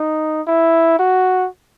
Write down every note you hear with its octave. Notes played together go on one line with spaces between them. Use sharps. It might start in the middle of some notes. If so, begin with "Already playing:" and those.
Already playing: D#4
E4
F#4